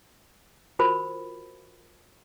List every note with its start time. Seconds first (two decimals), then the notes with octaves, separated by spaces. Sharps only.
0.79 F4 F#4 A#4 C5 B5